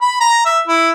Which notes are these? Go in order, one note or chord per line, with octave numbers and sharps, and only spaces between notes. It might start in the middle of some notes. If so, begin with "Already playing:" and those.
B5
A#5
E5
E4